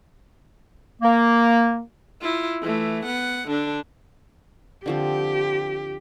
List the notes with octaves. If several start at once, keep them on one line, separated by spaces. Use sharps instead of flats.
A#3
E4 F4
E3 A3
B3 F#5
D3 D4
D3 F3 C4 G4